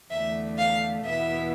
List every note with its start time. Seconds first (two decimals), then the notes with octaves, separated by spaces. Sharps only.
0.11 E2 D3 A3 E5
0.58 F5
1.05 E2 B2 B3 E4 E5